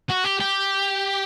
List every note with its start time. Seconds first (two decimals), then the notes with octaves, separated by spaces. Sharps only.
0.09 F#4
0.24 G4
0.40 G4